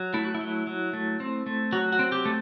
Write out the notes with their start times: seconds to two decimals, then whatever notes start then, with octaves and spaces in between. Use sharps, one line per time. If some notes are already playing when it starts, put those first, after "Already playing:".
Already playing: F#3
0.14 A3 E4
0.25 F#4
0.34 E4
0.41 F#3
0.67 F#3
0.93 A3
1.20 C4
1.46 A3
1.73 F#3 F#4
1.92 F#4
1.99 C4
2.12 G4
2.26 A3